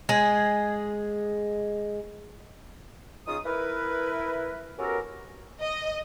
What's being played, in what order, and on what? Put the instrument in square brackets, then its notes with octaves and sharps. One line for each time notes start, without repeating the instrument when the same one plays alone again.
[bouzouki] G#3 G#4
[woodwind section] C#3 D#4 F4 G#4 D#6
E4 A#4 B4
B3 C#4 F#4 G4 A4 A#4
[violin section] D#5